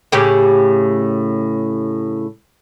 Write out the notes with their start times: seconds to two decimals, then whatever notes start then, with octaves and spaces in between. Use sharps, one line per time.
0.12 A2 C#3 G4